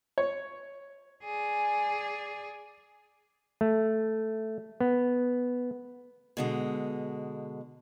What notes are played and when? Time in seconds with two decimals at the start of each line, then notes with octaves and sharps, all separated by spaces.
0.18 C#5
1.24 G#4 D5 G#5
3.61 A3
4.81 B3
6.37 B2 D3 G#3